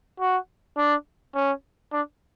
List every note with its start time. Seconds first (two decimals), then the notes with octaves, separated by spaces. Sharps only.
0.20 F#4
0.77 D4
1.35 C#4
1.93 D4